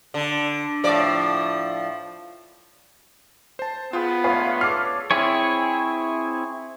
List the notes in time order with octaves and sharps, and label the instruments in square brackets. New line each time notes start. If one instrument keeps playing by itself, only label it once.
[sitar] D3
A2 F3 D5
[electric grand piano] C5 A5
[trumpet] B3 [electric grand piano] F4 [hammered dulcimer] G#4 G5
[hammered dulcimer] D3 G#3 A3 [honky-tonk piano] B4 C#5 F5
[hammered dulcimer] G#4 A4 C#5 [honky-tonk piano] D6 C7 [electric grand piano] F6
[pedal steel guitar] C4 E4 G#4 C#5